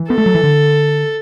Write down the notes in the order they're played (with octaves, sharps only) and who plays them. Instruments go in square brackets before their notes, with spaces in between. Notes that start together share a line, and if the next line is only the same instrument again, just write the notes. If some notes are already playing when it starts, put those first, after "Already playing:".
Already playing: [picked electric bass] E3
[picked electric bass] B3 [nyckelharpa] A4
[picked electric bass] A3
F#3
E3
D3